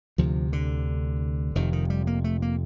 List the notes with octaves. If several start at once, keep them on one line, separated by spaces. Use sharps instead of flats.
D2 C3 F3
D3
F1 F2 C3 D#3
D#3
G3
A#3
A3
A#3